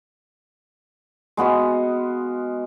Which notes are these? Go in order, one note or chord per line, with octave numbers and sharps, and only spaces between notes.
G#3 B3 F#4 F5